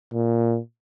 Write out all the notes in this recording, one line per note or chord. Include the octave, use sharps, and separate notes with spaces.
A#2